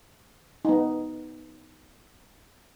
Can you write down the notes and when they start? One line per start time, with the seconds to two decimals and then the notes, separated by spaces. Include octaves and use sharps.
0.65 B3 D#4